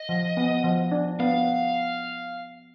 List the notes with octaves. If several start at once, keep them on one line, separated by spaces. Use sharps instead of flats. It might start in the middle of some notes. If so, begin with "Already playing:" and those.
Already playing: D#5
F3
B3
F3
D4
B3 F5